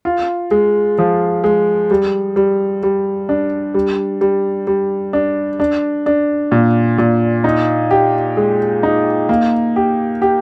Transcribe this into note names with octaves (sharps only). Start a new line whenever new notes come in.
F4
G#3
F3
G#3
G3
G3
G3
D4
G3
G3
G3
D4
D4
D4
A#2
A#2
D#4
G4
G#3
D#4
A#3
G4
G4